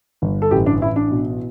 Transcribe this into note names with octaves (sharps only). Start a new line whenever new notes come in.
G1
A4
A1 G4
D4
A1 E4
D4
B2